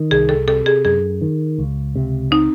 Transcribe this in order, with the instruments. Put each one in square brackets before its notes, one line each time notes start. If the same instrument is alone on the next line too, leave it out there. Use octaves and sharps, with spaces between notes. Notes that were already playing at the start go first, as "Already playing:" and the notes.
Already playing: [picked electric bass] D#3
[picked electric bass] C2 [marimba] G#4
[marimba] A4
[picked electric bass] C3 [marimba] A4
[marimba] G#4
[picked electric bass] F#2 [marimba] G#4
[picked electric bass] D#3
C#2
C3
[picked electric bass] C4 [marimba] D#4